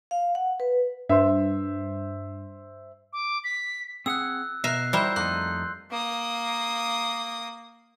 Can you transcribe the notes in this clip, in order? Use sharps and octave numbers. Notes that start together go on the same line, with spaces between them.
F5
F#5
B4
G2 C5 E5
D6
B6
C4 G#4 F#5 E6 F#6
B2 A#4 E5 F#6 C7
G3 D#4 E4 F#4 A#4 C5 E6 G6
F2 A3 A#3 D#4 C6 F#6
A#3 D#6